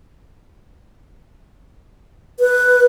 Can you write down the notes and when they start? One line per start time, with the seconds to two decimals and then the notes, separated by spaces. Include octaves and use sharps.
2.40 B4